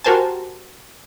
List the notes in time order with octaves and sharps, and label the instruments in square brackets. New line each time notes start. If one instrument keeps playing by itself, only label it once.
[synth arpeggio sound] F#4 G4 A#4 C5 G#5 A5